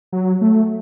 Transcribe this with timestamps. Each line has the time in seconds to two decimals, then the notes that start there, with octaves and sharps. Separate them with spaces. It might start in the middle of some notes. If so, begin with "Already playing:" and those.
0.13 F#3
0.41 A3